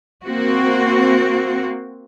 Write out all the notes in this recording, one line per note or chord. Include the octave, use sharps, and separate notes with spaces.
A#3 C4 F#4